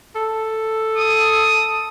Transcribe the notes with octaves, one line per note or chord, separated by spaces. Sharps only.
A4
D#6